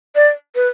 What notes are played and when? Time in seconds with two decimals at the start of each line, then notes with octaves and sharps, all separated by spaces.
0.16 D5
0.55 B4